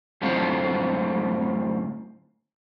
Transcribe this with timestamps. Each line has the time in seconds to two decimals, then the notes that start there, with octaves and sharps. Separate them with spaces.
0.22 F#2 A2 D3 A3 C4 F4